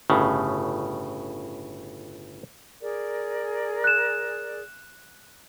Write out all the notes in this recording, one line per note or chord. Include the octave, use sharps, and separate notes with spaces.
G1 A2 C#3
G#4 A#4 D5
F#6 E7